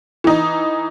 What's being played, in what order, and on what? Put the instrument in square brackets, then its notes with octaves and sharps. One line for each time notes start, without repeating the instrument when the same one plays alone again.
[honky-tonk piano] E3 D#4